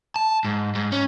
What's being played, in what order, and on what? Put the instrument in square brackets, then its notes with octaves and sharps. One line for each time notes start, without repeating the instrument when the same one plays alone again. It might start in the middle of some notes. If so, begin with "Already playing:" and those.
[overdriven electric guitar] A5
G#2
G#2
C#4